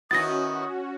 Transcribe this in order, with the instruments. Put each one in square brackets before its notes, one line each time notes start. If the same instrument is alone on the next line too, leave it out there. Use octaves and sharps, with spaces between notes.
[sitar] D#3 B3 E4 [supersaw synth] C#4 F#4 [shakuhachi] D#6 [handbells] A6 A#6